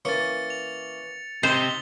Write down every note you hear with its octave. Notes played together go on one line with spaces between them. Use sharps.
E3 A#3 C#4 A6 C#7
F7
C3 D#4 C5 F7 G7